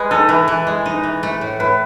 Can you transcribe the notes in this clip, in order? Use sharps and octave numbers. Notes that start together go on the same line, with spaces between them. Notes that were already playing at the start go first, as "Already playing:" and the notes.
Already playing: G#3 B4
D#4 A4
E3 B4
E3
G#3
D#4
E3
A3
A2
A2 B4